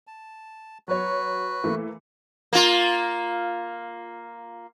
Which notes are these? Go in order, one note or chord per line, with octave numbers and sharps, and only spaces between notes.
A5
F#3 F#4 B4 C#5
E3 A3 A#3
A#3 F4